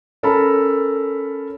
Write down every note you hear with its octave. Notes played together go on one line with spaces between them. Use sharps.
C#4 A4 A#4 A#5 B5